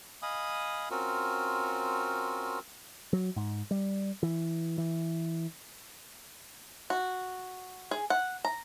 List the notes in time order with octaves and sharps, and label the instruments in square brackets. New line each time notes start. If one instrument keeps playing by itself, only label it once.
[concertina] D#5 F5 G#5 B5 D#6
C4 C#4 F4 F#4 A#4
[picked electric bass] F#3
G#2
G3
E3
E3
[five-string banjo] F#4
G#4
F#5
A#5